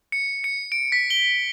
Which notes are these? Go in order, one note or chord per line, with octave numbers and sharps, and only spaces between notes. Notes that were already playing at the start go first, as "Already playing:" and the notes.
C#7
C#7
D7
B6
G7